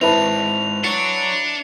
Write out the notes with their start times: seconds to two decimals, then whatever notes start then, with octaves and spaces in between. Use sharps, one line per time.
0.01 G#2 C4 E4 B4 A5 F7
0.84 D4 F#4 C#5 C#7